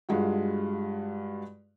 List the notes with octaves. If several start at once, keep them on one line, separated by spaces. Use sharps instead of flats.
G2 G#3 F4 F#4